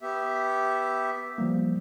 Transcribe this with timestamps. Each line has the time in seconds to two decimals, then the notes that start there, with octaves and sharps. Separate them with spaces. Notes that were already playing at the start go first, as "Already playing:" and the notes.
0.01 B3 G4 E5
1.38 F3 G3 A#3